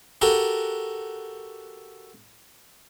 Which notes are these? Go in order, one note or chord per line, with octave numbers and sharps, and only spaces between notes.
F#4 G4 A4 A#4